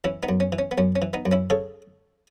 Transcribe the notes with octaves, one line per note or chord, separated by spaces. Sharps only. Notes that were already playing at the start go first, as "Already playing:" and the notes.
E3 C#4 E4
B3 D#4
F#2
C#4
E3
C#4
B3
F#2 C#4
C#4
E3
B3 D#4
F#2
C#4 E4
C#3 A4 C#5